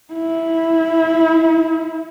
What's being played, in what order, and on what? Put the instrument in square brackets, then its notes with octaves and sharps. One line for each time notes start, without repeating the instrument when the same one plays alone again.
[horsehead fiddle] E4